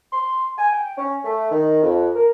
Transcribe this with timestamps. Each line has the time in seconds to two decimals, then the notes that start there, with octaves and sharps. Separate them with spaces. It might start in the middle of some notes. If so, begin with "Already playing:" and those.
0.12 C6
0.58 G#5
0.72 G5
0.98 C#4
1.24 A3
1.51 D#3
1.83 F2
2.15 A#4